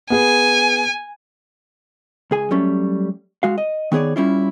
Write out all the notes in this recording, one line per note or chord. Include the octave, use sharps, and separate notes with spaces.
B3 G#4 G#5
C#2 G#4 G#5
F#3 G3 A3 C#4
G#3 F#4 F5
D#5
D#3 B3 G#4 C#5 D5
G3 C#4 E4 F4